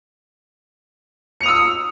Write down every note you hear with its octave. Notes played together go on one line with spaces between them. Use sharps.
D#6 E6 C#7 F7